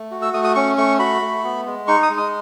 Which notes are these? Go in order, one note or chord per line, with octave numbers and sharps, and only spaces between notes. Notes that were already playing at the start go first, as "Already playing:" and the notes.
Already playing: A3
F#4
E6
A3 D#6
D#6
C#4 C#6
A3 C#6
F#4 B5
A3
B3
G#3
D#4 C#6
D#6
G#3
D#6